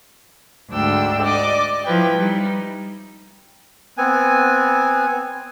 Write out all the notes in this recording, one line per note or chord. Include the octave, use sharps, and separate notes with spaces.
D2 G#2 D4 G5 E6
D5 D#5 D6
F3 E4 B4 G5
G3 D#4
B3 C4 G#5